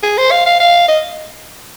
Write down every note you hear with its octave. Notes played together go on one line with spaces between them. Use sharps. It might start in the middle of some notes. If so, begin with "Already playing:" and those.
G#4
C5
F5
F5
F5
D#5